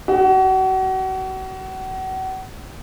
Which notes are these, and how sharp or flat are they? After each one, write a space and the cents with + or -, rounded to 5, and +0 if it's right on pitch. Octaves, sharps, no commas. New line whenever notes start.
F#4 +35